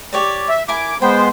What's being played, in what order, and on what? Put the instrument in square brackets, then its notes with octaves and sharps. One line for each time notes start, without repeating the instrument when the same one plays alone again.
[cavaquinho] G4 C#5 D5
[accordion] E5
[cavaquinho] E4 A#4 G#5 [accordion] D6
[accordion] G#3 B3 C5 [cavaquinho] G5